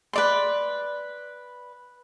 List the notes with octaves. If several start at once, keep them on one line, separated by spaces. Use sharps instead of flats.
B4 D5 C6